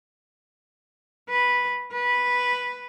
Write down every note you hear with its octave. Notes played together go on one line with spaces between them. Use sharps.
B4
B4